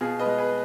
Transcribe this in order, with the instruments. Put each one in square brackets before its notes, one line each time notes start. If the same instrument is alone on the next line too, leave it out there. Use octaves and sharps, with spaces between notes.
[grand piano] B2 F4 G#4
B4 D#5
G#3
G#4 B4